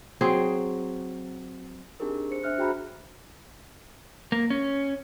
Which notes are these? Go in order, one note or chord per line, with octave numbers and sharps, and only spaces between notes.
F#3 C4 G#4
C4 D4 D#4 G4 G#4 A#4
C5 C#7
D4 C5 E5 F6 F#6
F#4 G#4 G5 A#5 B5
A#3
C#4